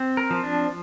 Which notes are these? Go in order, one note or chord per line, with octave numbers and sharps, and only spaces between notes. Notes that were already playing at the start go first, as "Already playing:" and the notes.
Already playing: C4
A#4
F3
D4